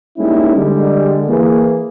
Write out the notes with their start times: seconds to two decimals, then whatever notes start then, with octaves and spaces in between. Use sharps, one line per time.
0.18 G3 G#3 A#3 C#4 D#4 E4
0.57 D3 G3 G#3
1.28 E3 A#3 G#4